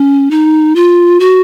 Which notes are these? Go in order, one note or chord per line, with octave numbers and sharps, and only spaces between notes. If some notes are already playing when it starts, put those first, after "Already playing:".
Already playing: C#4
D#4
F4
F#4